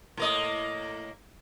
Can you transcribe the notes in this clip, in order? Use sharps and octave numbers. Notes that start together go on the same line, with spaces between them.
A2 A#3 D#5